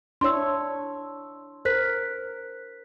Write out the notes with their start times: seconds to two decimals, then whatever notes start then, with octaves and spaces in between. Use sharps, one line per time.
0.21 D4 E4 C#5 C6 E6
1.65 A#4 C5 F#6 B6